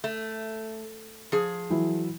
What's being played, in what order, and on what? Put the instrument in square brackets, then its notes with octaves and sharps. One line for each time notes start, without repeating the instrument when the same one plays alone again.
[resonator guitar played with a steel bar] A3
F3 G#4
[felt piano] E3 F#3 E4